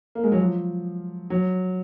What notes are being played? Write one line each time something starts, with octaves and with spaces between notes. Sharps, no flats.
A#3
G#3
F#3
F3
F#3